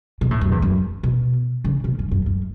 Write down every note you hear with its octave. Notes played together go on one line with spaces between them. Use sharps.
B2
A2
F#2
E2
F#2
B2
C#3
B2
F#2
F#2
F#2